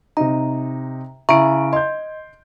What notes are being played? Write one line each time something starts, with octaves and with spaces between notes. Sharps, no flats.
C3 D#4 A#5
C#3 E4 E5 A#5 C#6 D7
D#5 C6 G6